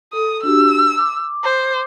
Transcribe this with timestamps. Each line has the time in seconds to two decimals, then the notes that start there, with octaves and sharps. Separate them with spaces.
0.13 A4 D#6
0.43 D4 F#4 G4 E6
0.98 D6
1.44 C5